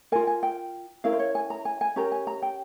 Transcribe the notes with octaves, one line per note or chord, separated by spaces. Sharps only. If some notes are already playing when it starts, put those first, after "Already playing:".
F4 A#4 G#5
G#5
G5
C#4 E4 A#4 F5
C5
C#5
G#5
A#5
G#5
G#5
C#4 G4 A#4 A#5
G#5
A#5
G5